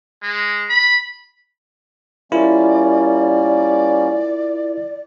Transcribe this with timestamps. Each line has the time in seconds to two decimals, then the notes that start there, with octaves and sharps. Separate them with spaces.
0.22 G#3
0.69 B5
2.32 G3 A#3 C#4 E4 F4 A#4 D5